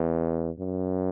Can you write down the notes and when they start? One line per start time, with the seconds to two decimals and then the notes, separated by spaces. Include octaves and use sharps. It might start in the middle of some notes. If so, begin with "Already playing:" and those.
Already playing: E2
0.59 F#2